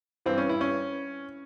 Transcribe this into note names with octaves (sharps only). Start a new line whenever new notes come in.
G2 E3 C4
C#4
E4
C#4